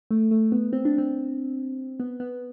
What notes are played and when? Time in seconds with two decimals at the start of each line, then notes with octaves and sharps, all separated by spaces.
0.11 A3
0.31 A3
0.52 B3
0.73 C4
0.85 D4
0.98 C4
2.00 B3
2.20 B3